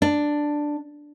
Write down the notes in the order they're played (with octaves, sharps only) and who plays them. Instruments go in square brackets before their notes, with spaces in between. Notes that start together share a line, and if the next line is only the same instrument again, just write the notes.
[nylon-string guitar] D4